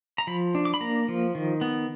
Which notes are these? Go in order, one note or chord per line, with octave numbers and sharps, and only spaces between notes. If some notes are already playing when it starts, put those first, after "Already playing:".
A#5
F3 B5
D4
D6
B5
A#3 A#5
F3
D#3
B3